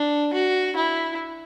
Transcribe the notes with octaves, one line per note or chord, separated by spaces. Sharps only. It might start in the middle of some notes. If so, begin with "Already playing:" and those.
Already playing: D4
F#4
E4